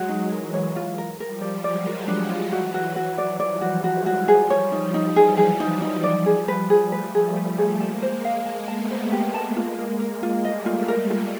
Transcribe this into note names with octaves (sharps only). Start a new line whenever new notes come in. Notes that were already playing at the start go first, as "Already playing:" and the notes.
Already playing: F#3 G#3 F#4
D#4
E3 F#3 A#4
C#5
F4
A#4
F3 G3 A#4
D5
F#3 G#3 D5
A#4
D4
F4
E3 F#3 F#4
F#4
E3 F#3 F#4
D5
F3 G3 D5
F#4
F#3 G#3 F#4
F#4
F3 G3 G#4
C#5
D#4
D#4
E3 F#3 G#4
G#4
E3 F#3 D#4
D#4
F3 G3 D5
G#4
B4
G#4
G3 A3 B4
G#4
B4
G#4
G#3 A#3 A5
C5
F5
A5
A3 B3 A5
C5
A3 B3 G4
A5
G#3 A#3 F4
A#4
A#4
F4
G3 A3 D#5
F4
G#3 A#3 A#4
F4